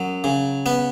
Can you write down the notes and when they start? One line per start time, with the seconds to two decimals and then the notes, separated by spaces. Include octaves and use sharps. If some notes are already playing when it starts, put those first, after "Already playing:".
Already playing: F#2 F#3
0.24 C#3
0.66 B3 B4